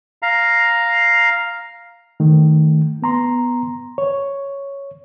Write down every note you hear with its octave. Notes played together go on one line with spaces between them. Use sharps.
F5 A#5
D#3 A3
B3 A#5 C6
C#5